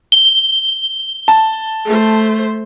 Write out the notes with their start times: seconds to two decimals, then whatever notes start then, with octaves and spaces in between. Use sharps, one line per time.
0.12 G7
1.28 A5
1.85 A3 C5